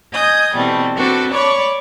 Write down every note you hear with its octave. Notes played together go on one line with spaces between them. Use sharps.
D#5 G#5 D#6 G6 G#6
B2 E3 G3 A3 C4
C4 D4 F#4 A4 B4
C#5 D5 B5 C#6 D6